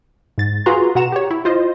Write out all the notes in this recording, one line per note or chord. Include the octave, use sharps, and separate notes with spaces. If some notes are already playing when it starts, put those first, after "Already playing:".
G#2 A6
F4 F#4 G#4 B4 A#5 C6
B2 F#4 F#5 A#5 E7
G4 C#5
E4
F4 C5 D#5